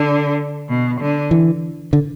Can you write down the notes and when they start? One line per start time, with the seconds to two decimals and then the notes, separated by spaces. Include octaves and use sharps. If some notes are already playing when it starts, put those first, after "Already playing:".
Already playing: D3
0.69 B2
1.00 D3
1.31 E3
1.93 D3